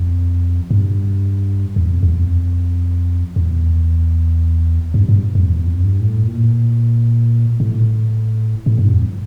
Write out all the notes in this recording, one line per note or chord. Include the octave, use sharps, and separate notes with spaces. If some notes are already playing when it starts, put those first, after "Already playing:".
Already playing: F2
G2
E2
F2
E2
F2
E2
G2
G2
F2
E2
F2
G2
A2
A#2
A2
A2
G2
F2